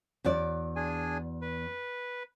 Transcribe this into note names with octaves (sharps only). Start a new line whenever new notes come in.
E2 F#4 D5
D4 G#4 G#5
B4